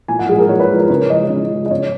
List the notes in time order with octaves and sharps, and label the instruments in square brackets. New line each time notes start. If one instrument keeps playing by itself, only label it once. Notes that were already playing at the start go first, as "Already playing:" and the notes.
[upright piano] A#2 G#5
F#5
F3 G#3 G#4
A#4
A#2 C#5
B4
F3 G#3 A#4
A#4
C#3 C#5
F3 G#3 D#5
C#3
F3 G#3
D#5
C#3 C#5